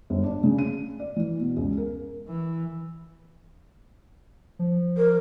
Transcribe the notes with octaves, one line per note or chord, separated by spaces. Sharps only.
G1
D4
C#3
D#7
D5
E3
B2
C#2
A#4
E3
F3
A#4